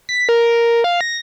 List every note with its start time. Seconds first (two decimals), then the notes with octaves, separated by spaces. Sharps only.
0.09 B6
0.29 A#4
0.84 F5
1.01 A#6